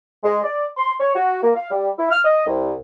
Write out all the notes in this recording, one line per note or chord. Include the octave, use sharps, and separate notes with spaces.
G#3
D5
C6
C#5
F#4
A#3
F5
G3
E4
F6
D#5
C2